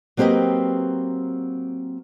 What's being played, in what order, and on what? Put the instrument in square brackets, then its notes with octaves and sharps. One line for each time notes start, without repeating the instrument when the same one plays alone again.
[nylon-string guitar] F#3 A#3 C4 G4 B4 D#5